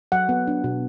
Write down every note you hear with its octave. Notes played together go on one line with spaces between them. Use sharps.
F#3 F#5
B3
D4
B2